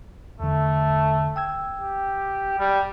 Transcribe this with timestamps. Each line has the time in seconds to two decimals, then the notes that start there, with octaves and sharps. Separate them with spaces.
0.40 E2 D3 A3
1.36 G5 E6 G#6
1.79 G4
2.59 G3